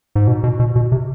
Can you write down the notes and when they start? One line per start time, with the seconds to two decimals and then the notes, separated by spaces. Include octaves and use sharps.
0.16 G#2
0.27 B2
0.44 B2
0.60 B2
0.76 B2
0.92 C3